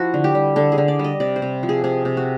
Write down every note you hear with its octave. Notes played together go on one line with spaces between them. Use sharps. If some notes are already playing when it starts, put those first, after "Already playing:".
Already playing: F3 E4 F#4
D3
G4
G3
D3 A4
G#4
D3
D5
G3
D#5
C3 D5
C5
C3
F3
G#4
C3 G#4
C3
F#4